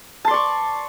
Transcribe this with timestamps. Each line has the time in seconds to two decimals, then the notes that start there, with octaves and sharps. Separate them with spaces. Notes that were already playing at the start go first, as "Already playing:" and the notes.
0.25 A5
0.28 C6
0.31 D5
0.34 C#6